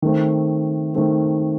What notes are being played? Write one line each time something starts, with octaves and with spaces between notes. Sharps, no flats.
D#3 A3 C4
D#3 A3 C4